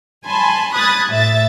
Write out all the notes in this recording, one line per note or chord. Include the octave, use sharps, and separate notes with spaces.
G#5 A5 B5 C6
B5 D#6 F#6 G#6 A6
A2 E5 A6